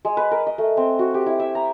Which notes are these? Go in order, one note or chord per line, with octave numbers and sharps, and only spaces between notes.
G#3
B4
A#4
D#5
A3
C4
F#4
G4
E4
E5
A#5